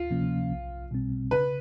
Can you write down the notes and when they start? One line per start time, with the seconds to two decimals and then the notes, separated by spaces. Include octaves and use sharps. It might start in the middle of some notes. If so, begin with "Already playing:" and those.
Already playing: D2 F4
0.11 C3 F3 A#3 C#4
0.51 B1
0.91 B2 G3 C4
1.31 C#3 B4